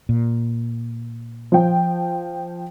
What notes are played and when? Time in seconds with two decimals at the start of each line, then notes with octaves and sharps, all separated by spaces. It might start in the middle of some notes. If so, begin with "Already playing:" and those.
0.09 A#2
1.52 F3 G5